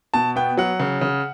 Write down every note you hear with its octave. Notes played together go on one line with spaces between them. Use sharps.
B2 A5
B3 G5
F#3 F#5
C#3
C#3